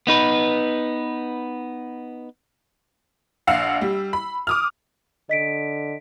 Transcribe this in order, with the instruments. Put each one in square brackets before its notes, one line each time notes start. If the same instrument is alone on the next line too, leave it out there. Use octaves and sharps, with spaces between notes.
[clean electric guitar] B3 D#4 B4
[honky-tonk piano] A#1 F5 F#5 E6 C7
G3
B5
D6 D#6 F6
[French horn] D3 [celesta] D#5 B6 D7